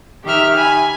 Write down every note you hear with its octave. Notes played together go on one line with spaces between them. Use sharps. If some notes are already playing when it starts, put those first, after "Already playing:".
D#3 G4 E5 F6
G#5 B5